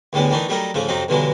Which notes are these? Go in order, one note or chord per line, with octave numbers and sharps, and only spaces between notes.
D2 A2 G3 G#3 B3
D#3 E3 A3 D4 D#4
F#3 G3 A3 D#4 A#4
G#2 C#3 F3 A3
F2 C3 F#3 C4 D#4
B1 G2 D3 E3 F#3 G#3